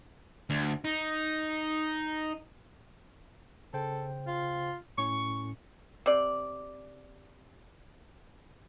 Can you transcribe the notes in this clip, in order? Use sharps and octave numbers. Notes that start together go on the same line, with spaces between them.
D2
D#4
C#3 A4 C5 G5
F4
A2 C#4 C#6
C3 D5